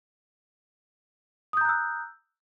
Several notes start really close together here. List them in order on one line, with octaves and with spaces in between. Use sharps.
D#6 G6 A#5 F#6 E6